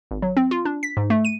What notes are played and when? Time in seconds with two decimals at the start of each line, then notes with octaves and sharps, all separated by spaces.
0.11 G#1
0.22 F#3
0.37 C4
0.51 F4
0.65 D4
0.83 B6
0.97 G#2
1.10 A3
1.25 D#7